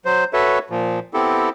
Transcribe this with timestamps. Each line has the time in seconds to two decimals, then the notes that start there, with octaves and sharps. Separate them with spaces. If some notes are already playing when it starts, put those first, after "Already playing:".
0.05 F#3 C5
0.33 F#4 A4 B4 C#5 E5
0.70 A#2 F3
1.14 B3 C4 E4 G4 A4